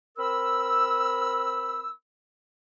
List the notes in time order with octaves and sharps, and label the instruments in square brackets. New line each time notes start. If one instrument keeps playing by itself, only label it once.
[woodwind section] C4 A#4 B5 E6